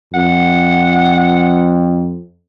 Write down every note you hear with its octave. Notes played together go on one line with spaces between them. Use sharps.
F2 F#5